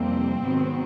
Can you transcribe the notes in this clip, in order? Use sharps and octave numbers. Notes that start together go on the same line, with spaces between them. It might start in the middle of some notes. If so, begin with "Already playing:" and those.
Already playing: F2 C3 E3 G3 A#3 C4
G#2 D#3 F#3 B3